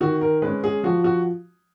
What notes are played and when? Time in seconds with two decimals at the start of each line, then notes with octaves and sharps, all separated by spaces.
0.01 D#3 F#4
0.21 A#4
0.42 G#3 C#4 B4
0.64 G#4
0.83 F3 F#4
1.04 F#4